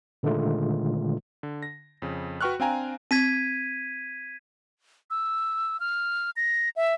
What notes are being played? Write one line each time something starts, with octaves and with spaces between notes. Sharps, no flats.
A#2 D3 D#3 G#3 A3 F4
D3
A#6
F2 C#3
F#4 B4 G5 C#6 F6 F#6
C4 D4 F5 G5 G#5 A#5
C4 G#6 B6 D#7
E6
F6
A#6
E5